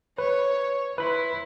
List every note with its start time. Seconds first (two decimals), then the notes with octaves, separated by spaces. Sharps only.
0.18 B4 C#5
0.98 E4 B4 B5 C6